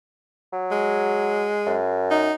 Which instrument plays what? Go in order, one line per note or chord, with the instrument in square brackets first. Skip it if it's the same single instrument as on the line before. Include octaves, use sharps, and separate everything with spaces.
[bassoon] F#3
[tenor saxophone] G#3
[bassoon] F#2
[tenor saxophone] D#4